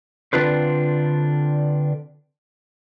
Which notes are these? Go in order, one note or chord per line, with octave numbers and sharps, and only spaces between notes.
D3 C4 D4 F4 B4 C5